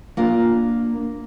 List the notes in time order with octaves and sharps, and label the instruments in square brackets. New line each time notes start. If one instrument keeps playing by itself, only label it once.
[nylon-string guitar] A#3 D4 F4 A#4